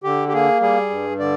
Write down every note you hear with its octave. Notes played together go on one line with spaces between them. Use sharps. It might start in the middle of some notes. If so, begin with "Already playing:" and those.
D3 G4
G4
A#3 G#4
G3 G#4
G2
D3 D5